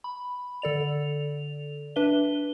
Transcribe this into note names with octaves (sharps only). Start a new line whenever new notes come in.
B5
D3 A4 D5 F7
D4 B4 E5 G7